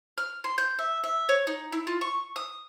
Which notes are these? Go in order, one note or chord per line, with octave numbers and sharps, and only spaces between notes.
F6
C6
G6
E5
E5
C#5
D#4
E4
F4
C#6
D#6